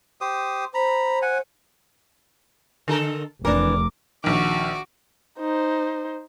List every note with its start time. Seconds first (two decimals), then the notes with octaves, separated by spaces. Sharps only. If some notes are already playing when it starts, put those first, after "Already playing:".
0.21 G4 C5 D#6
0.74 C5 A#5 B5
1.22 F#5 G#5
2.88 D3 A4 A#4
3.45 F1 E3 D4 A#4 D6
4.24 A#1 D#3 F#4 D6
5.39 D#4 C5